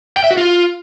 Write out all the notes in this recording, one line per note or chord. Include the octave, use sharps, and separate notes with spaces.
G5
E5
F#4
F4